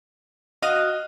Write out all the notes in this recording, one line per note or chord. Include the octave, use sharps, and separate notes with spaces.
F#4 D#5 F5 D#6